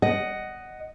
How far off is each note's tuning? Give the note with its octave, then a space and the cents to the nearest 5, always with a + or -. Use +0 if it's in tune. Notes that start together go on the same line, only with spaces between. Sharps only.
D#5 +0 F#5 +10